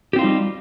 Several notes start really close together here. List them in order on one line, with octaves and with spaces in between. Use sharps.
G4 C4 F4 D#4 G3